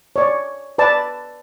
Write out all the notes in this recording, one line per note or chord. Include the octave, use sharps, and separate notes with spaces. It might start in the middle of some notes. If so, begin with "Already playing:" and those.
C#5 D5
B4 D5 A5